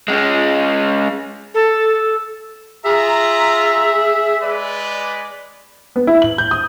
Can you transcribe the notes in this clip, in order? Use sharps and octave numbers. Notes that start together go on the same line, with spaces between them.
G#3 C#4
A4
F4 G#4 E5 A#5
G#3 B4 D5
B3
E4
F#7
G6
D#6